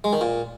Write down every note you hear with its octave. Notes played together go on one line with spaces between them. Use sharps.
G#3
D#3
A#2